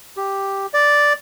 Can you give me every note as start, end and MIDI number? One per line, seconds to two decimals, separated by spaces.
0.17 0.66 67
0.74 1.13 74